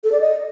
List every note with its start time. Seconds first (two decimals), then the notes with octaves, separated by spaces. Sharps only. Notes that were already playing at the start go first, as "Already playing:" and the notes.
0.04 A4
0.12 D5
0.20 D#5